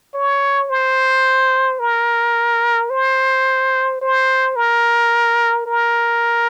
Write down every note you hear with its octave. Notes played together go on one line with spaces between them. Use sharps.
C#5
C5
A#4
C5
C5
A#4
A#4